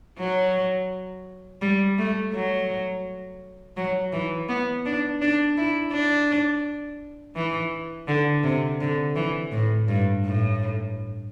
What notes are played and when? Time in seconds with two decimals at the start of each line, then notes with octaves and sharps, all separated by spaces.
0.19 F#3
1.62 G3
1.98 A3
2.33 F#3
3.77 F#3
4.13 E3
4.48 B3
4.85 D4
5.22 D4
5.57 E4
5.93 D4
7.36 E3
8.08 D3
8.44 C3
8.81 D3
9.15 E3
9.52 A2
9.88 G2
10.24 A2